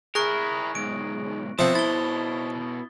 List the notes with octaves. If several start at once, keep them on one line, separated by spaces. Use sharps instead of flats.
E4 G#4 A#4 C#6 F#6 A#6
B1 G#2 D7
B2 F3 C4 A4 C5 E5 F#5 D#6
E4 A6 G7